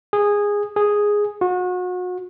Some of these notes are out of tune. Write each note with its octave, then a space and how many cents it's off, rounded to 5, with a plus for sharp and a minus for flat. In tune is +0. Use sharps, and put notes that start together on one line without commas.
G#4 -15
G#4 -5
F#4 -35